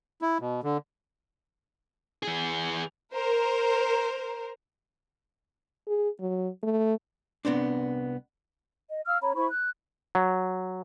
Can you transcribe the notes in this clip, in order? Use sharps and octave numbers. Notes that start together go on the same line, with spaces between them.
E4
B2
D3
E3 G#4
A#4 C5
G#4
F#3
A3
C2 B3 C4 D4
D#5
F5 E6 F6
C#4 C#5 A#5 B5
E4 C5 B5 C#6
F#6
F#3